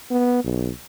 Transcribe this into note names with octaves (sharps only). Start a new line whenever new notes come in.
B3
B1